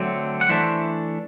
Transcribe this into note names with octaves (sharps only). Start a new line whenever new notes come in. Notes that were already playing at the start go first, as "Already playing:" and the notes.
Already playing: D3 F#3 A3 C4
F#5
E3 A3 D4 C5 E5